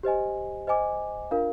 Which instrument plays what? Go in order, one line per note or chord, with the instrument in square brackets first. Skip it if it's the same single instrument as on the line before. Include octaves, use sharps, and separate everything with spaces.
[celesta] G4 C5 D#5 G#5
C5 D#5 G#5 D6
D4 F4 A#4 F5